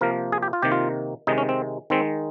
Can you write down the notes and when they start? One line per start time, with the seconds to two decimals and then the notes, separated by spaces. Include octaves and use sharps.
0.01 C3 F3 A#3 A#4
0.32 G#4
0.42 G4
0.53 F4
0.62 C3 D#3 A#3 G4
0.72 F4
1.27 C3 D#3 G#3 D#4
1.38 C#4
1.49 C4
1.90 D#3 G#3 C4